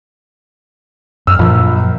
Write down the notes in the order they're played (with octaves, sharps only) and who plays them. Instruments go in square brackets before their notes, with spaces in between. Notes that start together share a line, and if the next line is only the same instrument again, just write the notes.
[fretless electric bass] F#2 [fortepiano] E6 F6
[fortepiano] A#1 [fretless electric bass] F#2 A#2 F3